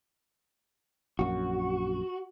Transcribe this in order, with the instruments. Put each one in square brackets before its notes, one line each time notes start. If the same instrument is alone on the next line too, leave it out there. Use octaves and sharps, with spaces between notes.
[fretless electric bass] A#1 F#2 [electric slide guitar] F#4